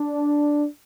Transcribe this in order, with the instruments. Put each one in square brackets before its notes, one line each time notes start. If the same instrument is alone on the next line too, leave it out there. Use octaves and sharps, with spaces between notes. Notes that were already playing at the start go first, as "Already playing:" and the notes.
Already playing: [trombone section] D4